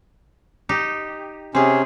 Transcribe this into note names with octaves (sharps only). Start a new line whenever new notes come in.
D#4 G4
C3 C4 C#4 G#4